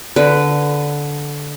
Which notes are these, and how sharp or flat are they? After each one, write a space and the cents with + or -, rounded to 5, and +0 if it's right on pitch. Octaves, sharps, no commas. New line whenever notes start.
D3 -10 B4 +0